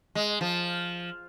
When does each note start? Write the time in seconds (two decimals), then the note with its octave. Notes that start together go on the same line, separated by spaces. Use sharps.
0.15 G#3
0.41 F3